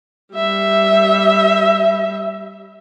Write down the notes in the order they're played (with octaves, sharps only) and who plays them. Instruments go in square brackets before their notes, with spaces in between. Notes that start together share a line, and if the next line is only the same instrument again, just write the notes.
[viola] G3 E5